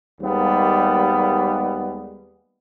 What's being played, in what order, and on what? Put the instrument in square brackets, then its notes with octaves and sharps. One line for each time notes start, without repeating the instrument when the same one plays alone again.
[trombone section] D#2 G3 G#3 A#3 B3